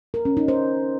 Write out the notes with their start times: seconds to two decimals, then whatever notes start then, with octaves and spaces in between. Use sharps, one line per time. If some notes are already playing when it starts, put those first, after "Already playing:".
0.14 A#4
0.25 C#4
0.37 D#4
0.48 C5